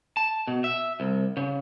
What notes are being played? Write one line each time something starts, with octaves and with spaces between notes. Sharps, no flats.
A5
B2
E5
C2
C#3